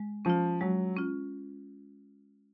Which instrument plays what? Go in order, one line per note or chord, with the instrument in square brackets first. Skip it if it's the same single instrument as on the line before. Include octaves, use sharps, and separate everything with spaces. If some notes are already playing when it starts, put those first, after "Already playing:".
Already playing: [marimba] G#3
[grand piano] F3 [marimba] C#4 F4
[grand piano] F#3 [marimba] G#3
[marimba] C#4 F4